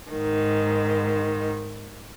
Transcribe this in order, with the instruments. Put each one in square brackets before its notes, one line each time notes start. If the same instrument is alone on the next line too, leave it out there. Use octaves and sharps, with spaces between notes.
[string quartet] G#2 D#3